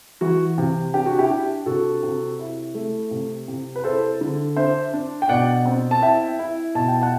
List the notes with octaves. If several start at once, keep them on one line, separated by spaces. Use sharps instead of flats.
E3 F#4
C3
D4 G4
F#4
E4 G4
D4
C3 F#4 A4
C3
E4
A3
C3
C3
B4
E4 A4 C5
D3
D4 C5 E5
D4
G5
B2 D5 F#5
C4
A5
E4 E5 G5
E4
B2 A5
G5
F#5 A5